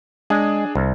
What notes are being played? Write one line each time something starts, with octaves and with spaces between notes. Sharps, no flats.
G#3 D4 G#4
C2